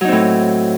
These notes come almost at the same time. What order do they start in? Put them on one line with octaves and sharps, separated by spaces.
F#3 D#4 C4 A2